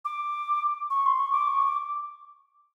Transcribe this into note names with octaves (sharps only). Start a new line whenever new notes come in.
D6
C#6
C6
C#6
D6
C#6
D6